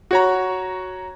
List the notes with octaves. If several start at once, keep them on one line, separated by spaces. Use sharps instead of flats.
F#4 C#5 A#5